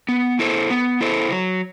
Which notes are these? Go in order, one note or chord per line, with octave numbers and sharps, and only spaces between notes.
B3
E4 A4 C5
B3
E4 A4 C5
F#3